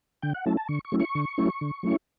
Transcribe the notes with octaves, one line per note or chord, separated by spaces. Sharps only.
D3 G5
F#5
F#3 A3 C#4 E4 A5
A5
D3 C#6
C#6
F#3 A3 C#4 E4
C#6
D3
F#3 A3 C#4 E4
D3
F#3 A3 C#4 E4